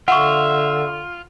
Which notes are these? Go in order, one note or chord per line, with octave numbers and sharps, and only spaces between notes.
D3 F4 E5 F#5 C#6